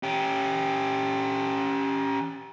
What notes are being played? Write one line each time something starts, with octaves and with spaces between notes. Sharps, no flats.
C#4 G4